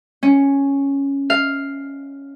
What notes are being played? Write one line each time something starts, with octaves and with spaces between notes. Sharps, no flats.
C#4
F5